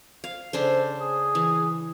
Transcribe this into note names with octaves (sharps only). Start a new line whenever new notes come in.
F5
C#3 D4 A4 C5
G#4
E3